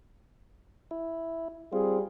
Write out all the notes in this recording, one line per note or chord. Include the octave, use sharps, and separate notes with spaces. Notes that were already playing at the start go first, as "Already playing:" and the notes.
E4
G3 C4 F4 G#4